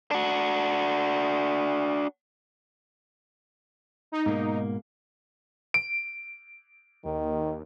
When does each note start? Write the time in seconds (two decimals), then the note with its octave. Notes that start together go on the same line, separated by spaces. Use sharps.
0.11 D4 F#4
4.12 D#4
4.26 G#2 B2 A#3
5.74 D7
7.05 D#2 D#3